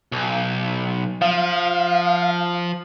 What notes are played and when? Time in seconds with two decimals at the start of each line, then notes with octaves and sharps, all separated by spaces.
0.12 B1
1.21 F3 F5